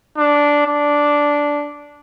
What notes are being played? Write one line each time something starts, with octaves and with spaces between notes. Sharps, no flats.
D4
D4